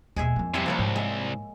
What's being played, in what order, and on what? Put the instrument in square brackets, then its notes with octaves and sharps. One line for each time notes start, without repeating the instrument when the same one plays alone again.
[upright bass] D#2 B2 [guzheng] G#3 G#4 E5
[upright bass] F2 A#3
[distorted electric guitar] C3 B3 [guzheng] G3 E4
[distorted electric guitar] C2 [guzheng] F3 A#3 C#5
[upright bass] G#2
[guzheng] G#3 E5